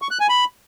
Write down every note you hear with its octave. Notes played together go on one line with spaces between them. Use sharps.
C#6
F#6
G#5
B5